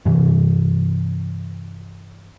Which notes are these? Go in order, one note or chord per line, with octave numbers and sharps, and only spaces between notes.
G2 C3 E3